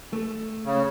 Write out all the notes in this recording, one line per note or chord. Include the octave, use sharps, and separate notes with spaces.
A3
C#3